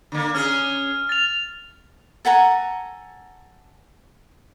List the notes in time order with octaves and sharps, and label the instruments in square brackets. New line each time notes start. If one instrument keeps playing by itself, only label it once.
[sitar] D3 A#3
[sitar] C#4 G#4 [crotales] F6
[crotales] A6 F7
[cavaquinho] A4 F#5 G#5 A#5